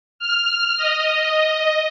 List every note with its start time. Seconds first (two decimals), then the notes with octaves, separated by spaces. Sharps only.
0.19 F6
0.76 D#5